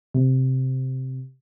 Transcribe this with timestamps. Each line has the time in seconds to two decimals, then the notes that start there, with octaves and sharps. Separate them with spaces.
0.14 C3